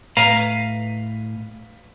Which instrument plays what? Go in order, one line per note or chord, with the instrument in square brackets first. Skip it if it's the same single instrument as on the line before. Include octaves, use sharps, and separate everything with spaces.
[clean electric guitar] A2 [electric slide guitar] B4 F5 A#5